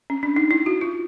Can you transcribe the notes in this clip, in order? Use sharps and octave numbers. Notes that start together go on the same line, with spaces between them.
C#4
D4
D#4
E4
F#4
F4